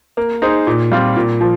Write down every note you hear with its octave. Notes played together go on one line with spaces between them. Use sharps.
A#3
D#4 G#4 C5
A#2
G3 C4 F4
A#2
F3